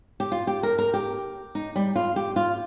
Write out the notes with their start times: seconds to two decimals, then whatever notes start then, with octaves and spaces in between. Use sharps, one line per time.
0.20 G4
0.32 F4
0.47 G4
0.63 A#4
0.79 A#4
0.94 G4
1.55 D#4
1.76 G3
1.96 F4
2.16 G4
2.36 F4